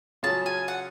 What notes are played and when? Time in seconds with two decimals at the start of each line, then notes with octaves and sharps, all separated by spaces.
0.23 C#3 F#3 C#4 F4 G#4 A5
0.46 G#5
0.68 F#5